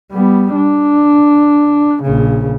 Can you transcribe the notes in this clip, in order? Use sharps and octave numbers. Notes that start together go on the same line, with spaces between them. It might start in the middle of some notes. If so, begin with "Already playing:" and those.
G3 B3
D4
A#1 C#3